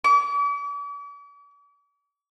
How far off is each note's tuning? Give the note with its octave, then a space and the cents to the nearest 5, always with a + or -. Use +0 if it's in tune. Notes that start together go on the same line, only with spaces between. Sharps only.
D6 -45